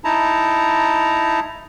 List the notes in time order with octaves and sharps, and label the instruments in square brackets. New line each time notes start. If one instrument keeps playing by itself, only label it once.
[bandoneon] D#4 E4 A5 A#5